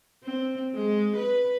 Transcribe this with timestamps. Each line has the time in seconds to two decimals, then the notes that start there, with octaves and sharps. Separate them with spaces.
0.23 C4
0.74 G#3
1.16 B4